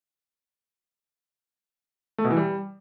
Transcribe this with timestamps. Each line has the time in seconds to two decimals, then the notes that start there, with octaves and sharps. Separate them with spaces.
2.18 A3
2.24 B2
2.31 E3
2.37 G3